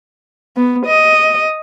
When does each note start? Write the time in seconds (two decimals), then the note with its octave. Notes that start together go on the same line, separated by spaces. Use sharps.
0.57 B3
0.86 D#5